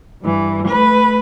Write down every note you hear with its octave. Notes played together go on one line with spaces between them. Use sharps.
G2 E3
A3 B4